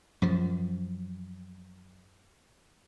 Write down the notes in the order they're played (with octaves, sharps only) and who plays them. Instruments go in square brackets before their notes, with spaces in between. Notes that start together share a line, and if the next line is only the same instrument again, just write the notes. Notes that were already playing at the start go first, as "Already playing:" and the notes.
[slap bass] F#2 F3